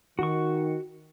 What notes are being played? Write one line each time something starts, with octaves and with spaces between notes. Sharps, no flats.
D#3 F#4 C#6